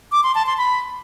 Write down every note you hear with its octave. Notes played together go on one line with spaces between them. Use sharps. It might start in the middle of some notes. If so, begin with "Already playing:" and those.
D6
C6
A5
C6
B5